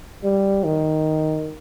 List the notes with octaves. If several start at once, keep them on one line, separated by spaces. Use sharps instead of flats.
G3
D#3